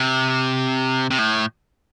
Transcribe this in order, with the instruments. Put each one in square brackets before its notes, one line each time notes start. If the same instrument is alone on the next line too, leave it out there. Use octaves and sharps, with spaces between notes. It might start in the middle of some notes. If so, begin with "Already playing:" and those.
Already playing: [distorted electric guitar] C3
C3
A2